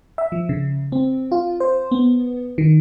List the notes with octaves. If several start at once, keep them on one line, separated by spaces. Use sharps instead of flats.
E5
F3
C#3
C4
F4
C5
B3
D#3